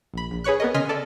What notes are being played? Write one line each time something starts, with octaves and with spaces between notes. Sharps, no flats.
A#1 B5
A#1
G#4 B4 C#5 C#6 F#6
B3 A#4 D#5
C#3 D#5 G#5 C6 F6 B6
A4 D5